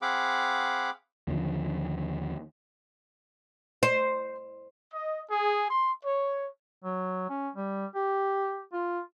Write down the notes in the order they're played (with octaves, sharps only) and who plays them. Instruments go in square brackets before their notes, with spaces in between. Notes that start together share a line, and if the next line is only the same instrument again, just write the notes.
[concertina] C4 G#4 F5 F#5 B5 D6
[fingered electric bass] D#2 D3 F3
[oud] C5
[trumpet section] D#5
G#4
C6
C#5
[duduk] F#3
C#4
G3
G4
F4